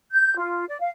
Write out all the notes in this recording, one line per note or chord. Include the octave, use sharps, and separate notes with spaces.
G6
F4
D5
F5